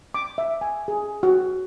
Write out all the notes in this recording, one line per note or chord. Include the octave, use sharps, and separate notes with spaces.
D6
E5
G#5
G#4
F#4